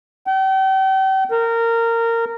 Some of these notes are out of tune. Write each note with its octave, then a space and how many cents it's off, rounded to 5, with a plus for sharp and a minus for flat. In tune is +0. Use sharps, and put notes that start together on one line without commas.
G5 -40
A#4 -20